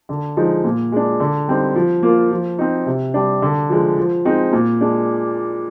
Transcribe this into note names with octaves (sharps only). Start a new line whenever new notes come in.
D3
F3 G#3 D#4
A#2
G#3 D4
D3
G3 C4 D#4
F3
A#3 F4
F3
C4 D#4
C3
G3 D4
D3
F3 G#3
F3
G#3 C4 D#4
A#2
G#3 D4